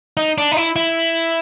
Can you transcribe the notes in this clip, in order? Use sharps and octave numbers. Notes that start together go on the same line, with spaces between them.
D#4
D4
D#4
E4
E4